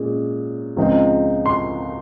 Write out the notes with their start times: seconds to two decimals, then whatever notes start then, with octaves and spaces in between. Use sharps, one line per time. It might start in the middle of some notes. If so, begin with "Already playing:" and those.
Already playing: A#2 G#3 C#4
0.77 C#2 C#3 F3 C4 D#4
1.46 C6